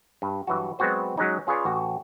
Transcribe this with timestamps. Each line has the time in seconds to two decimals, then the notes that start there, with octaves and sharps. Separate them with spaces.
0.22 G2
0.47 G2 E3 F#3 F#4
0.79 F#3 G#3 B3 C4 F#4 C5
1.17 F#3 G#3 C#4 D#4
1.47 C#4 F4 G#4 B4 C#5 D5
1.65 A1 F#4